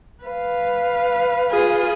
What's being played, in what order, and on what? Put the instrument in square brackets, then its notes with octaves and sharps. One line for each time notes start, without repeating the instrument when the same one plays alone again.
[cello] B4 F5
[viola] F4 G#4